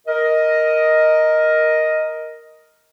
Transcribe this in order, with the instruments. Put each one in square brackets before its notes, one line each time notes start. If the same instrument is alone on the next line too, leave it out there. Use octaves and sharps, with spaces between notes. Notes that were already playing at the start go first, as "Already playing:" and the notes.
[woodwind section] A#4 D#5